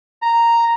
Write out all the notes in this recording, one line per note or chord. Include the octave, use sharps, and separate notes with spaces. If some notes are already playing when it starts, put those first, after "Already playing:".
A#5